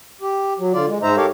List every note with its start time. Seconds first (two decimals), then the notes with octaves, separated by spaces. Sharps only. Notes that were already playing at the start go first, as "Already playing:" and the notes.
0.21 G4
0.59 F#3
0.74 D3 F4 D5
0.88 G#3
1.03 G#2 G#3 D#4 C5 E5 A#5
1.17 G4 A4 A#4 C#5 F5